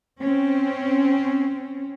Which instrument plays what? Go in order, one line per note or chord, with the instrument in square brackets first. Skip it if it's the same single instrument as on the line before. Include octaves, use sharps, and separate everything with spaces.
[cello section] C4 C#4